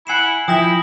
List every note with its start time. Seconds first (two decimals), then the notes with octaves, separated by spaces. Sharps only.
0.07 E4 F#5 G#5 C7 E7
0.48 F3 E4 G5 D#6 A#6 F#7